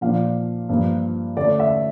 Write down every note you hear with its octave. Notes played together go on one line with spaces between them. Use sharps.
A#2 F3 A#3 D4 F5
G2 F3 A#3
D3 A3 C#4 D5
E5